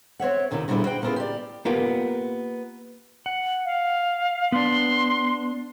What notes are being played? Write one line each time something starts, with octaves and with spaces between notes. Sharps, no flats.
C4 C#5 E5 F#5
D#2 C3 D#3 E4
A#2 D3 G3 C4 E4 G#4
F#4 C5 G5
C#3 A#3 B3 E4 F4 G#4
G4 D5
A#3 B3 F4 G4 A#4
F#5
F5
B3 D4 C6